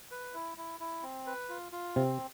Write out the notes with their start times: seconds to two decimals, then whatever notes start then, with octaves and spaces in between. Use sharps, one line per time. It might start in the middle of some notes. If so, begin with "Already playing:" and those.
0.11 B4
0.34 E4
0.58 E4
0.80 E4
1.03 C4
1.27 B4
1.49 F4
1.72 F4
1.96 C3 C4